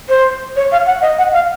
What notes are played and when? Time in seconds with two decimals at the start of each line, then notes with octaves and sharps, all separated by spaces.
0.09 C5
0.56 C#5
0.72 F5
0.86 F#5
1.02 D#5
1.18 F#5
1.33 F5